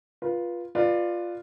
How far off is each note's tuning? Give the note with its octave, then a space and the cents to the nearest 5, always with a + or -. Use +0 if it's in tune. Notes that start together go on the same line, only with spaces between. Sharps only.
F4 +0 B4 -25
F4 +0 B4 +0 D5 +20